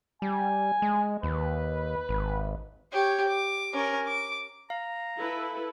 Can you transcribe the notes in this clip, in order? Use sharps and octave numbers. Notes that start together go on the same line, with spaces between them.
G3 G#5
G#3
D#2 B4
G#1
G4 C#5
D6
C#4 A#4
D6
F5 A#5
E4 A4 B4